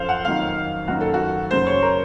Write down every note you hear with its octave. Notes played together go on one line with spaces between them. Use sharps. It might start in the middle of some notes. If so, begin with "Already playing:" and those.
Already playing: F#2 F3 A4 C5 F5
F#5
F2 D#3 F#3 F5
F#2 D#3 F#3 F#4
A4
F#4
F#2 C#3 F#3 C5
C#5
A#4